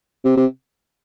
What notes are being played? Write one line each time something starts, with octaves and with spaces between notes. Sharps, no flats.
C3
C3